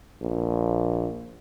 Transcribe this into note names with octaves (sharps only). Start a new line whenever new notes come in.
A#1